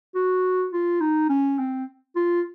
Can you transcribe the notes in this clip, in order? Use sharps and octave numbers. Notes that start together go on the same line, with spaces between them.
F#4
F4
D#4
C#4
C4
F4